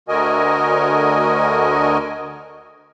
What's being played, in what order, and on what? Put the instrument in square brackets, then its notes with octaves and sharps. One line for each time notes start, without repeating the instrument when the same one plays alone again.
[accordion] D2 D3 F#4 A#4 D#5 G#5